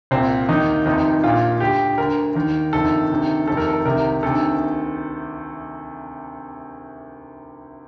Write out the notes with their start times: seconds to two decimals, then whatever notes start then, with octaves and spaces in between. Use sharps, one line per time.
0.11 C2 A#2 C4
0.49 D#2 D#3 D#4
0.86 F1 F2 C3 D#3 D#4
1.23 A#1 A#2 F4
1.60 D2 D3 G4
1.98 D2 D3 A#4
2.36 D#2 D#3
2.73 G1 F2 C3 D#3 A4
3.10 D2 C3 D#3
3.47 F1 F2 C3 D#3 A4
3.57 A#4
3.67 A4
3.85 C2 C3 D#3 A#4
4.23 D2 C3 D#3 A4